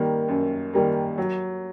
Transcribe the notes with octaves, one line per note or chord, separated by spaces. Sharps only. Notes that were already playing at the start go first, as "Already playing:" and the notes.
Already playing: D#3 G3 A#3
F#2
D#3 G3 A#3
F#3